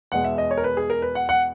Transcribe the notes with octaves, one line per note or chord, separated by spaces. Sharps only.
E2 B2 G#3 F#5
E5
D#5
C#5
A#4
B4
G#4
A#4
B4
F#5
F#5